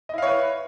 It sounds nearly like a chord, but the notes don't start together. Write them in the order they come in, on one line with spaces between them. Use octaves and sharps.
D#5 E4 F5 C#5 B4